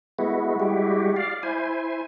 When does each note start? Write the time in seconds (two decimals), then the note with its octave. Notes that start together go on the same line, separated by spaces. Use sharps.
0.19 G#3 A3 B3 E4 F#4
0.59 G3 G#3 E4 F#4 G4
1.16 D5 F5
1.43 E4 C5 G#5